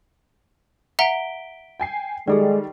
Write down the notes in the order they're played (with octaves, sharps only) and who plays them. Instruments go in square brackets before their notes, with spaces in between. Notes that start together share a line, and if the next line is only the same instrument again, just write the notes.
[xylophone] E5 F#5 A#5 [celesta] B6 D7 G7
[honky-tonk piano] G5 G#5 C7
[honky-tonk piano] D#3 G3 [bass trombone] G#3 [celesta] G#4 A4 D5